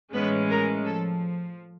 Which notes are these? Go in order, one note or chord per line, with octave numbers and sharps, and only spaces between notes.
A2 E3 G#3 B3 C#4 B4
A#4
F3 A4